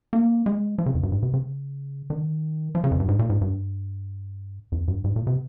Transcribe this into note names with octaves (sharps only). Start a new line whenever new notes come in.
A#3
G#3
F3
C#3
F2
G2
G#2
C3
C#3
D#3
F3
C#3
F2
G2
G#2
A#2
G#2
G2
F2
G2
G#2
A#2
C3